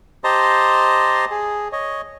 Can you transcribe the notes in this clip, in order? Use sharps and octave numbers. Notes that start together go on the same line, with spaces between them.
G4 C5 D#5 A5 A#5 C6
G#4
C#5 D#5